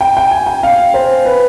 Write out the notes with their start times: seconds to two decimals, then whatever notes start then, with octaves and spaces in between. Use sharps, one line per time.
0.01 G5
0.17 G5
0.31 G#5
0.47 G5
0.63 F5
0.94 C5
1.25 B4